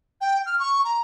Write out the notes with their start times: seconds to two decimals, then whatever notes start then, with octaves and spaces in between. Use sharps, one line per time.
0.21 G5
0.46 F6
0.59 C#6
0.84 A#5